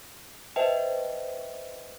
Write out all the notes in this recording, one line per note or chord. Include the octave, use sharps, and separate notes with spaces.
B4 C5 D#5 E5 G5 A5